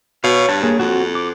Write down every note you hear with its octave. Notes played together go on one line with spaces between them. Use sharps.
B2 C#5 F5
G2 A5
A#3 G#4 C#5
F2 C4 F#4
D6